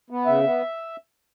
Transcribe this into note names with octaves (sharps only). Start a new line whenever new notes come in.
B3
C#3 E5
B3